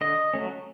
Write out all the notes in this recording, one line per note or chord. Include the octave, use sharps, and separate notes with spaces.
D3 D#5
F#3 A3 C#4